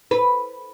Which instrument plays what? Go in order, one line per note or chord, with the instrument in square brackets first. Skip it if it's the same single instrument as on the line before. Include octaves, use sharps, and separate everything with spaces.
[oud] B4